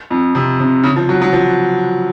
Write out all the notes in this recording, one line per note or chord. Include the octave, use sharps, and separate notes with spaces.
F2
C3
C3
C#3
F3
F#3
F#3
F3